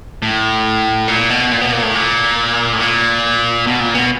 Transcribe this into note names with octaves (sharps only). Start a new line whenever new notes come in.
A2
A#2
B2
A#2
B2
A#2
A2
A#2
A2
A#2
B2
A#2
B2